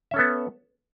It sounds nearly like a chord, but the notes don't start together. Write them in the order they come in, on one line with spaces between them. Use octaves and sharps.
E5 C#4 A4 B3